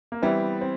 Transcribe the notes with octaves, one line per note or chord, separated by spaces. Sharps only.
A#3
E3 G3 B3 C4 E4
C4